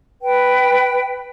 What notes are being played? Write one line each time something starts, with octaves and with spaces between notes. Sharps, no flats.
B4 G5